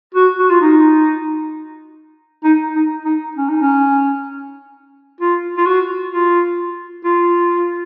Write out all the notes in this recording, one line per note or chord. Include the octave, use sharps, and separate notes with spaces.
F#4
F#4
F4
D#4
D#4
D#4
D#4
C#4
D#4
C#4
F4
F4
F#4
F4
F4